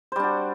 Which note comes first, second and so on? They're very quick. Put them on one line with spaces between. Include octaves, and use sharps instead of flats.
C5 G3 D4 F#4